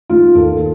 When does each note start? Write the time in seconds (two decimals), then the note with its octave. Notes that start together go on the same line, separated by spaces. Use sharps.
0.09 D#3 F4
0.35 D#2 A4